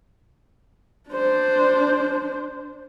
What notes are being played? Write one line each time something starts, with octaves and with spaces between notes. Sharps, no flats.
D4 C5